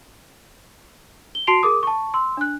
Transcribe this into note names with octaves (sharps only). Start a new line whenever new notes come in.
G7
F#4 A5 C6 C7 D7 F7
G#4 A#4 D6 D#6
A5 C#6
C6 E6
D4 F#6